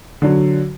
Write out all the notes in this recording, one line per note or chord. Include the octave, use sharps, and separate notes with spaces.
D3 F#3